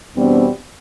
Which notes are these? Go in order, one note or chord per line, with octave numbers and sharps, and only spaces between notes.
E2 B2 G3 B3 C4 D4